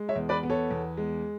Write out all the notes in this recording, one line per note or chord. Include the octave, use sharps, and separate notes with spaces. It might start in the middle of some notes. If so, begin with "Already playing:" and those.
Already playing: G#3
C#5 E5
E2
B4 D5
B3
A4 C#5
E2
G#3